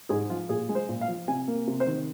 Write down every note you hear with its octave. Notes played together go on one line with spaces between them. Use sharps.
G#2 G#4
F3 F4
A#2 G#4
G#3
C5
A#2
F5
F3
C3 G#5
A#3
C3
C5
D#3